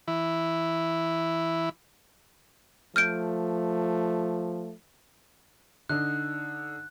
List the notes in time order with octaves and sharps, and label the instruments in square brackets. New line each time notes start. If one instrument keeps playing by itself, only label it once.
[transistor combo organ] E3 E4
[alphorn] F3 [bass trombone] A3 [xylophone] F6 G6 D7
[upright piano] D3 D4 D#4 [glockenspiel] F#6